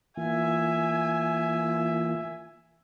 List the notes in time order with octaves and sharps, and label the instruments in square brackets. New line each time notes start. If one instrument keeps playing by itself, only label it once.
[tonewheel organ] E3 A#3 F4 [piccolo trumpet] E5 [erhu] G#5